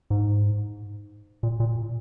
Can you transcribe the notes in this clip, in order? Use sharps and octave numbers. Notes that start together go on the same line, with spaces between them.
G#2
A#2
A#2